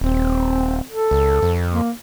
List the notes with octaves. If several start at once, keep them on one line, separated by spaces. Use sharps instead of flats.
D#1 C4
A4
C#2
F2
A#3